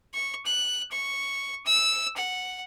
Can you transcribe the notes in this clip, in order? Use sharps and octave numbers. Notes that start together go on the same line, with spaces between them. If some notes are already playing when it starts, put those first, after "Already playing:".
C#6
F#6
C#6
E6
F#5